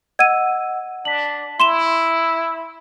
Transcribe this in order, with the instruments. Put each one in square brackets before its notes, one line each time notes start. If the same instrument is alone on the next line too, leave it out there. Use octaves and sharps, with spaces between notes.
[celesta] D#5 F#5 E6 [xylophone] G#6 D#7
[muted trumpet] D4 [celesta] B6 F#7
[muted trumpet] E4 [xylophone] C6 E7 G7